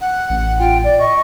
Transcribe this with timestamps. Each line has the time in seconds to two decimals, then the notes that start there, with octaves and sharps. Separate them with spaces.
0.01 F#5
0.30 A1
0.59 F4 G5
0.84 D5 G5
0.99 D#5 C#6